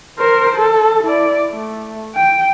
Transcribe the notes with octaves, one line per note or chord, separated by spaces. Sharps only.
A#4 C5
A4
E4 D5
A3
G5